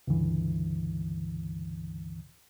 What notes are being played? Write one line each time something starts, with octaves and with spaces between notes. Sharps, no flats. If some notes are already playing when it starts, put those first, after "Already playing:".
C#2 G2 D3 E3